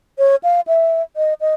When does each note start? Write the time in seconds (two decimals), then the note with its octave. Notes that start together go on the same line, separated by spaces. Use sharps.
0.19 C#5
0.43 F5
0.67 E5
1.16 D#5
1.41 D#5